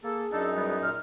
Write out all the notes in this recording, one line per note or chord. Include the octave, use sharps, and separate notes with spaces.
A#3 G#4 A4
F#2 D4 D#4 A4
E2 G3 B3
A#2 F6